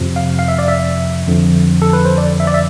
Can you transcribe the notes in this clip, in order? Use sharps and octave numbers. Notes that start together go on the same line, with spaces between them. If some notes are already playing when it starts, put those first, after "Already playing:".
Already playing: F2 C3 F3
F5
F5
E5
D5
E5
F2 D3 F3
A4
B4
C5
D5
E5
D5
E5